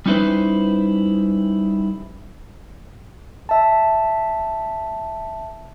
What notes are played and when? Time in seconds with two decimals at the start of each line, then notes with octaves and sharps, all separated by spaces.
0.06 G3 C#4 D#4 E4 B4 C5
3.49 E5 A5